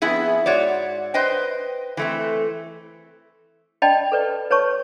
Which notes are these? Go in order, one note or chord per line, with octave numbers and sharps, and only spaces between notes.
F2 B3 E4 G#4
G#2 F#4 C#5 D5
B4 C5 D#5 G5
E3 A3 C4
D5 D#5 G5 A5 B5
A4 B4 D5
B4 C#5 A5 C#6